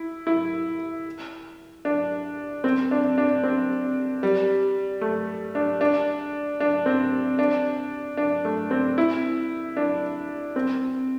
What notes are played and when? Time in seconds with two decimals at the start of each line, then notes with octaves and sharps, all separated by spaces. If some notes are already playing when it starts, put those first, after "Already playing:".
Already playing: E4
0.27 E4
1.85 D4
2.64 C4
2.91 D4
3.18 D4
3.43 C4
4.23 G3
5.01 A3
5.55 D4
5.81 D4
6.60 D4
6.86 C4
7.39 D4
8.17 D4
8.45 A3
8.71 C4
8.98 E4
9.77 D4
10.56 C4